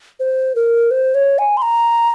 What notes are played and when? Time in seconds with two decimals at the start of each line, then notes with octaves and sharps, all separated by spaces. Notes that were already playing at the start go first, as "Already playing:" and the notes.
0.20 C5
0.55 A#4
0.91 C5
1.15 C#5
1.39 G#5
1.57 C6
1.62 A#5